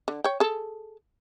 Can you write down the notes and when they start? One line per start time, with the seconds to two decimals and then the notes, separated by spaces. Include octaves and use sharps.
0.08 D3
0.24 C#5 G5
0.40 G#4 A4